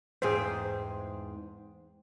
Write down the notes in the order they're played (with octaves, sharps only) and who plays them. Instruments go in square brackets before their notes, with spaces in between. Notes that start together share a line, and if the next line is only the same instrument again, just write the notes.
[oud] E2 G#2 C4 [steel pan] G#4 C5